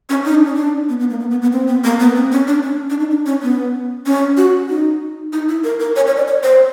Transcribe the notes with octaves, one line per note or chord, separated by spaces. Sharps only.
C#4
D#4
D4
C#4
D4
B3
B3
A#3
B3
B3
B3
C4
B3
A#3
B3
C4
C#4
D4
C#4
D4
D#4
D4
C#4
B3
C#4
F#4
D#4
D#4
E4
A#4
A#4
C#5
C#5
D5
C#5
C5